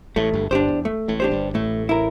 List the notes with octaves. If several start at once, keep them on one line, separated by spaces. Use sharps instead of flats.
A1 A2 A3
G1 G2
G1 G2 D4 G4 C5
E2
A3
A1 A2
D4 G4 C5
G1 G2
A1 A2 A3
E4 A#4